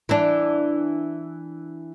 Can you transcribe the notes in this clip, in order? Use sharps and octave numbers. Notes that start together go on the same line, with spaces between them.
E3 D4